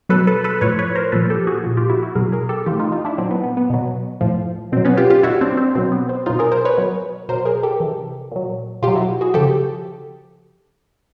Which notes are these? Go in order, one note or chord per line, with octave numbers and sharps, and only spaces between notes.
B2 F#3 A4 B4
A4 B4
A4 B4
A2 F3 B4 C#5
B4 C#5
A#4 C5
A#2 F3 A4 B4
G4 A4
F#4 G#4
A#2 F3
F4 G4
E4 F#4
E4 F#4
B2 F#3 G#4 A#4
G#4 A#4
G4 A4
E3 F4 G4
A2
D#4 F4
D#4 F4
D4 E4
A#2 F#3 C4
B3
B3
B3
B2 F#3
A2 F3
B2 F#3 C4
B3 C#4
F4 G4
F4 G4
B2 F#3 E4 F#4
C4 D4
C4
B2 F#3 C4
B3
C4
B2 F#3 D#4 F4
G#4 A#4
A#4 C5
B4 C#5
B2 F#3
B2 F#3 A#4 C5
G#4 A#4
G4 A4
C3 E3
A#2 F#3
B2 F4 G4
F#3
E4 F#4
F#4 G#4
C#3 F3 G4 A4